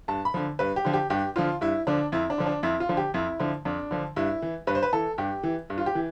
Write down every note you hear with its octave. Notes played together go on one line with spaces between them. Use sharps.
G2 A5
B5
D3 F3
G2 B4
G4
D3 F3
G4
G2 G4
D3 F3 F4
G2 E4
D3 F3 D4
F2 E4
D4
D3 F3
D4
F2 E4
F4
D3 F3
G4
F2 E4
D3 F3
F2 D4
D3 F3
G2 E4
E3
G2 B4
C5
B4
E3 A4
G2 G4
E3
G2
F4
G4
E3